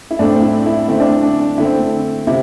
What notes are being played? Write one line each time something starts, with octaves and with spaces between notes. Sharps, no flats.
E4
A2 A3 C4 D4
E4
E4
D3 A3 C4 E4
D4
D4
D3 A3 C4 E4
C3 E4